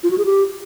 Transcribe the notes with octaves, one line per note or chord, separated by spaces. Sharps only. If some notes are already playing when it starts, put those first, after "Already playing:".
F4
F#4
G#4
G4